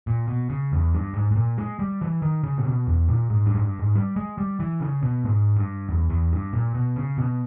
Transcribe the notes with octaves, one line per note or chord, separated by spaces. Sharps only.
A#2
B2
C#3
E2
G2
G#2
G#2
A#2
G#3
G3
E3
D#3
C#3
A#2
B2
E2
A#2
G#2
G2
G#2
G2
G#2
G3
G#3
G3
E3
C#3
B2
G#2
G2
E2
E2
G2
A#2
B2
C#3
B2